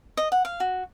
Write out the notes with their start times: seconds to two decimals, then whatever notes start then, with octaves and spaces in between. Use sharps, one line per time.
0.17 D#5
0.32 F#5
0.45 F5
0.60 F#4